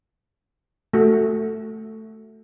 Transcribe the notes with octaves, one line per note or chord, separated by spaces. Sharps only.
A3 F#4